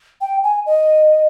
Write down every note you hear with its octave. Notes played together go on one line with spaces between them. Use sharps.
G5
G#5
D#5